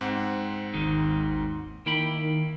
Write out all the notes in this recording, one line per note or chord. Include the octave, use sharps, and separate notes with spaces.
G#2 C4 F#5
G#1 D#2 D#3 D#4
D#3 A#3 E4 G5 B5